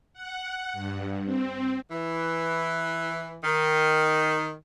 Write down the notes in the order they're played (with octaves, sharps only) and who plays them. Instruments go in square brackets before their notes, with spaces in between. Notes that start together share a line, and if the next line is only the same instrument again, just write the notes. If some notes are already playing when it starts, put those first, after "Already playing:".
[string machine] F#5
G2
C4
[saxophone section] E3
D#3